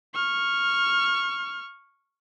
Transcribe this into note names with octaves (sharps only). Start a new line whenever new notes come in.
C#6 F6